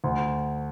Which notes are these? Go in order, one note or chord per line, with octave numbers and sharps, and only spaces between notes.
D2